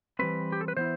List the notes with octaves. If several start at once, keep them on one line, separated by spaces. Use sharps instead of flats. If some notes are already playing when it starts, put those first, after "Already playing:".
E3 G3 C4 B4
G4
A4
B4
E3 B3 E4 C5